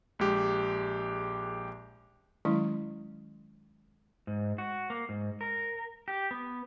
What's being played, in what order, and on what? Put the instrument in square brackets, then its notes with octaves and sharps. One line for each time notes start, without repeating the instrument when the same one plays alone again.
[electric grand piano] A#1 G#3 G4
[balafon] D#3 F#3 G#3 C#4 E4
[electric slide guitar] G#2
F#4
A#3
G#2
A#4
G4
B3